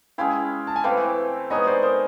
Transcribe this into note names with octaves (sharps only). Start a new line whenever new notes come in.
G#3 C#4 E4 F5 G5
A5
G#5
E3 A3 C4 F5 G5
G#3 B3 D#4 C#5 D#5
C5 D5
A#4 C5